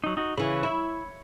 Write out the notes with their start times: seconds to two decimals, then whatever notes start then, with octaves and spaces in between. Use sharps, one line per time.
0.04 F#3 D#4
0.17 D#4 F#4
0.37 C#3 E3 C#5 B5
0.63 E4